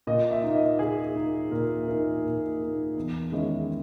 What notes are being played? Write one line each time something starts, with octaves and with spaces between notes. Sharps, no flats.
A#2 D#5
E5
A#3 D#4
D#5
A#2 G#4
A#3 D#4
A#2 A#4
A#3 D#4 A#4
A#2
A#3 D#4
E2
D#3 G#3 C#4 E4